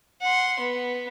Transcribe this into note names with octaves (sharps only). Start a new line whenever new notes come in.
F#5 C6
B3